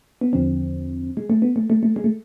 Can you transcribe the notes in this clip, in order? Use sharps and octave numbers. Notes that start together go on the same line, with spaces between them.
B3
E2 D3 F3 C4
G#3
A3
B3
A3
A3
A3
G#3
A3